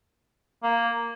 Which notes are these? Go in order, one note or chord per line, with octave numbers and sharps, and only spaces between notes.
A#3